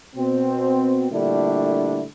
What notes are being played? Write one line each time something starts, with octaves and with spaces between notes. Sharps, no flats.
B2 C4
A#2 D3 G3 A3 D4 E4